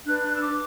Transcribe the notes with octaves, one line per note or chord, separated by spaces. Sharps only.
D4 B4 F#6
F#6
E6
D6